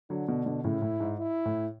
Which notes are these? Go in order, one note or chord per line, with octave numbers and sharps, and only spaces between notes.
D3 F#3 D4
B2 D3
B2 D3
A2 C#3 E4
A2
G#2
E4
A2